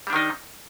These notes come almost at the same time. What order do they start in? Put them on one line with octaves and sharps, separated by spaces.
G3 D4 D#3 D#4